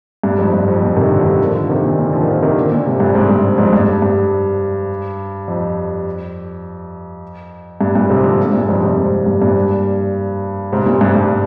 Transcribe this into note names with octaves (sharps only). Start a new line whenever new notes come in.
G2
F2 G#2
G2
F2
A#2 D3
C3 D#3
D3 F3
D#3 G3
D3 F3
D3 F3
C3 D#3
A#2 D3
A#2 D3
D3 F3
D#3
D3 F3
C3 D#3
A#2 D3
A#2 D3
G#2 C3
G2 A#2
G#2 C3
G2
F2 G#2
G2
G2
F2
G2
G2 A#2
G#2 C3
D3 F3
G2 A#2
F2 G#2
G#2 C3
G#2 C3
G2
G2 A#2
G#2 C3
G2 A#2
G2
G2